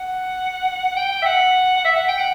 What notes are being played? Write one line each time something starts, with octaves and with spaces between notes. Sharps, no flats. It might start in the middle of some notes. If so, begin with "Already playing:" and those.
Already playing: F#5
G5
G5
E5
F#5
F#5
E5
F#5
G5
F#5